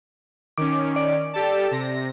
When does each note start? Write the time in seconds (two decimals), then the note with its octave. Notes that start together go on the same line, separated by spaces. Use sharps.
0.58 D#3 C#4 D6
0.96 D5
1.33 G4 A4 A5
1.71 C3 A#6